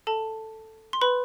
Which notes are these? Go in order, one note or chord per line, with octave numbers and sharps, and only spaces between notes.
A4 A5
C6
B4 B5